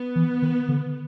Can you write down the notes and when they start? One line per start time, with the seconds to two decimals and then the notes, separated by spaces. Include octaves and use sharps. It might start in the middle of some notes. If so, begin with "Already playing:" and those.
Already playing: B3
0.16 E3
0.42 D#3
0.69 D3